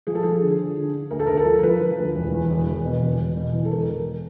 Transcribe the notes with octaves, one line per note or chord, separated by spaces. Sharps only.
F3 G#4
A4
F3 G#4
D3
D3
D3
D3
D2 A#4
A4
D2 A#4
A4
F3
A#4
F3 B4
F3
D2
E1
E2
E1
E1
B2
E1
E1
B2
E2
A4
E1 A#4
E1